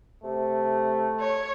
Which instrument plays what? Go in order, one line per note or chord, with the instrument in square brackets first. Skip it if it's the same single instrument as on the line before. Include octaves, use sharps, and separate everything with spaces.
[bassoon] C3 [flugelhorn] A3
[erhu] C#5